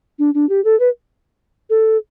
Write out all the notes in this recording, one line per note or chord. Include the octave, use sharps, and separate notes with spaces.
D4
D4
G4
A4
B4
A4